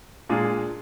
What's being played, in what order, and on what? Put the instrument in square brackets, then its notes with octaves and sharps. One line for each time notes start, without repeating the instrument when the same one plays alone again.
[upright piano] A#2 G#3 D4 F4 G#4